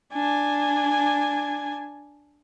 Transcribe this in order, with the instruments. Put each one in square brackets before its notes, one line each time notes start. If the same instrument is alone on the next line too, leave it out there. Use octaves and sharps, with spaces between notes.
[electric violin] D4 G#5